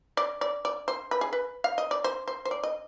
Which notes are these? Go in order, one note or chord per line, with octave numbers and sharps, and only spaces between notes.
D5
D5
D5
C5
B4
G#4
B4
F5
D#5
D5
C5
C5
C5
D5
D#5